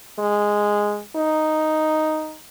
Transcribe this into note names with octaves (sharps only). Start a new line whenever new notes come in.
G#3
D#4